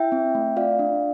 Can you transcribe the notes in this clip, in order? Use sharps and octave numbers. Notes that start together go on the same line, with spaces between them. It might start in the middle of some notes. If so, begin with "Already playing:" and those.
Already playing: E4 E5 G5
C4
A3
F4 D5 F5
D4